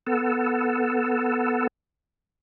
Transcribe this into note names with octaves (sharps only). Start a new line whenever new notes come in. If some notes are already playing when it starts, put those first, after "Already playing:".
B3 A4